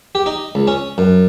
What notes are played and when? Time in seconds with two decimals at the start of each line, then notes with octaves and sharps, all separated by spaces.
0.15 G4
0.26 D#4
0.55 C#2
0.67 C#4
0.98 F#2